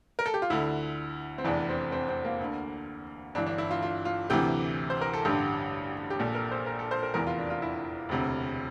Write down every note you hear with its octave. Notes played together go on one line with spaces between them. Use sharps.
A#4
A4
G4
F4
D2 D3 E4
C4
F1 E2 E3 D4
C4
C4
C4
A#3
D2 D3
G1 G2 E3 D4
D4
E4
F4
F4
F4
D2 C3 E3 G4
C5
A#4
A4
A1 G2 D3 G4
G4
A#1 A#2 A4
A#4
C5
A#4
A4
C5
A#4
F1 E2 E3 A#4
F4
D4
F4
E4
E1 D2 C3